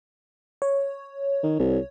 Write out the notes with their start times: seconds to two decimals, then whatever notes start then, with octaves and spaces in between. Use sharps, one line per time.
0.62 C#5
1.44 D#3
1.59 C2